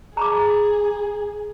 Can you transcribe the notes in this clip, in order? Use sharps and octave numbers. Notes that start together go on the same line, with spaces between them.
G#4 A#5 B5 D6